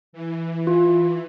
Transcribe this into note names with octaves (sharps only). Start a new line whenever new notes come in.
E3
F4